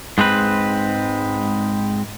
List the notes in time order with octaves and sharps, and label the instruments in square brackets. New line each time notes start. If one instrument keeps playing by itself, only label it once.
[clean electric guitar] G#2 G#3 C4 B4